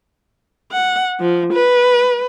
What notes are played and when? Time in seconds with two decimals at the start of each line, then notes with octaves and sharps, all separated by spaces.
0.72 F#5
1.19 F3
1.53 B4